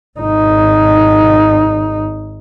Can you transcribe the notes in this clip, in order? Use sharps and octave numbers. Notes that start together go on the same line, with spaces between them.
G#1 D#4